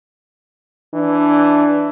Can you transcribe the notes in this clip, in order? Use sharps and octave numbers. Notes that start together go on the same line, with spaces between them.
E3 D4